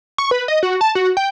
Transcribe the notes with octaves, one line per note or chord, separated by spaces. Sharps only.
C#6
B4
D#5
F#4
A5
F#4
G5